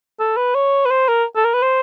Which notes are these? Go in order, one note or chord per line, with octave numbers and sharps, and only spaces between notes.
A4
B4
C#5
B4
C5
A#4
A4
A#4
B4
C5